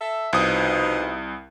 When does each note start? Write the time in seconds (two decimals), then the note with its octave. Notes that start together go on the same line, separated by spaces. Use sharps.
0.01 A4 E5
0.33 C2 B2 F3 D#4 D#6